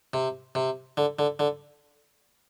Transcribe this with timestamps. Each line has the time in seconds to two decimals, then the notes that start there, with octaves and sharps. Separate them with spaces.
0.14 C3
0.55 C3
0.97 D3
1.19 D3
1.39 D3